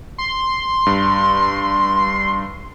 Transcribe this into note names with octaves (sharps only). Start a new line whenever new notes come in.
C6
G2